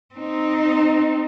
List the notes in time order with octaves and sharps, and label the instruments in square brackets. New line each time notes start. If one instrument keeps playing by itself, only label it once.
[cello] C4 D#4